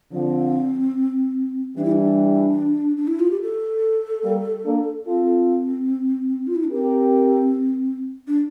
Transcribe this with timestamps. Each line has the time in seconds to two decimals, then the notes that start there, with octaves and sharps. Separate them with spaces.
0.12 D3 F3 C4
1.77 E3 G3 D4
1.84 E4
1.91 D4
2.97 D4
3.07 E4
3.19 F4
3.30 G4
3.42 A4
4.24 G3 A#3
4.65 A#3 D4
5.06 C4 F4 A4
6.47 F4
6.55 E4
6.64 D4
6.71 C4 G4 A#4
8.27 D4